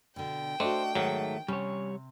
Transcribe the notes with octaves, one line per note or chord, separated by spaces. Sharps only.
B2 D3 G5
A3 D4 F#4 A4 C5 D#5
G#2 D#3 F#3 A3
C3 G3 C#4 C#5